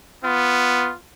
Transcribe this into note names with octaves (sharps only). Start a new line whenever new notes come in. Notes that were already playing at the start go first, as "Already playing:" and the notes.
B3 F4